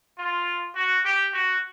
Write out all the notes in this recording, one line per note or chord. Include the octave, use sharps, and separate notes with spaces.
F4
F#4
G4
F#4